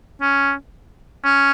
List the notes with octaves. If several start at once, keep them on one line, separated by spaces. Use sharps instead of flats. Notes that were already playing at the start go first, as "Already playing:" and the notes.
C#4
C#4